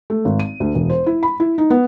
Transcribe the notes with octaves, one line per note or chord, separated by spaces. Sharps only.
A3
G#1
D#7
D2
E1
C5
E4
B5
E4
D#4
B3